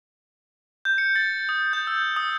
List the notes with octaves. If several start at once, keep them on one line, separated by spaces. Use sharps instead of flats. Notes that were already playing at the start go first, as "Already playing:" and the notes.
G6
C#7
A6
D#6
G6
E6
D#6